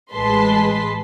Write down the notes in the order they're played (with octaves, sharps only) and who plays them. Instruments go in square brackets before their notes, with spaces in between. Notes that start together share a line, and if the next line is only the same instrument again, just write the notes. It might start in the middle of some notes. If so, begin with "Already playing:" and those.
[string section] A1 G#3 B4 A5 C6 B6